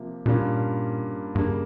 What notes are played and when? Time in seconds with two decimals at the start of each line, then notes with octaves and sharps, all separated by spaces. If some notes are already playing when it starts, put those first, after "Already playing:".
Already playing: C3 F3 A#3
0.26 G2 A#2 G3 A#3 C#4 F4
1.35 G2 C#3 G3 A#3